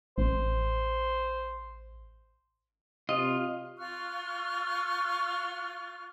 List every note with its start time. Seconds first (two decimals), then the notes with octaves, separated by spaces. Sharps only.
0.18 A1 C5
3.09 C3 F4 D#5
3.77 F4 C#6 F6 F#6